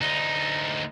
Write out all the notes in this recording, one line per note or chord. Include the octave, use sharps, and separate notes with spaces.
D2 D#4